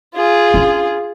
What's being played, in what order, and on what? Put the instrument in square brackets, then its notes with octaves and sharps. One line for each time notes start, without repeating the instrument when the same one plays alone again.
[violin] F4 G#4
[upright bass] C#4 D4